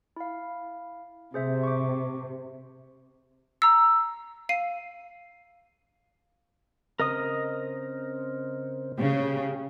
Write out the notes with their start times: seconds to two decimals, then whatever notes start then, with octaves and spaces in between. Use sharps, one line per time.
0.16 E4 F5
1.34 C3 G#4 C5 E5
1.63 C#6 D6
3.62 A#5 E6
4.49 F5 C7 D#7
7.00 C#3 C4 A#4 D#5 D#6
8.98 C#3 G4